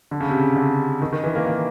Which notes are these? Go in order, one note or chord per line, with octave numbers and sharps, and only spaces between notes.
D3
C#3
C3
C#3
D3
D#3
D#3
E3
A#3
A#3